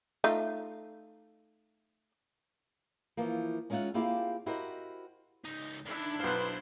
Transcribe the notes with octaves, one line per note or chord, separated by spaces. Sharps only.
A3 D#4 F4
E3 F3 A#3
G#3 C#4 D#4 F4 E5 F#5
A#3 C4 E4 F4 G4 G#4
E4 F#4 G4 A#4 C5 D#5
C#2 D#4
D3 D#3 D4 E4
B1 B4 C5 F5